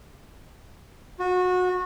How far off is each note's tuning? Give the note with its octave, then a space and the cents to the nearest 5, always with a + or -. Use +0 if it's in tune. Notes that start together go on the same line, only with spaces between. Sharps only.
F#4 -25